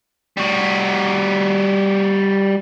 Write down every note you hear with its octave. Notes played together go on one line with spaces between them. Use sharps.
G3 F#4